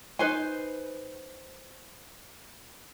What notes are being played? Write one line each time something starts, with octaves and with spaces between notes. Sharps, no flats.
D#4 B4 C5 G#5